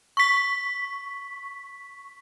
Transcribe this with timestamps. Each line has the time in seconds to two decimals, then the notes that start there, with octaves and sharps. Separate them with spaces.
0.17 C#6 B6